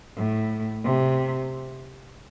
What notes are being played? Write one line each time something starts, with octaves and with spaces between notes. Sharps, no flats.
A2
C3